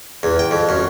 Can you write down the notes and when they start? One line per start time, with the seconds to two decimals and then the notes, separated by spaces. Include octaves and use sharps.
0.23 E2
0.39 G5
0.51 F2
0.69 F#2